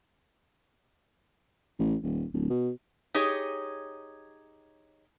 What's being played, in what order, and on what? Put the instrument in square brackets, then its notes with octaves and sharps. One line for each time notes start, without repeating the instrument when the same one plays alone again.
[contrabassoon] A1
D#1
D1
B2
[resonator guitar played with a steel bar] D#4 G4 G#4 C#5